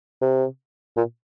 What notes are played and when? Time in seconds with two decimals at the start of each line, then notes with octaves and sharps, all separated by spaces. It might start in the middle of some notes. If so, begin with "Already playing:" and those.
0.22 C3
0.97 A#2